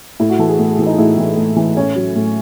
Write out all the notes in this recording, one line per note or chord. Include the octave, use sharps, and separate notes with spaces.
A2 E4
F#4
E3 A4
G#4
A2
E3
D#4
A2 E4
E3
A2
E3
A2 C#4
F#3
A2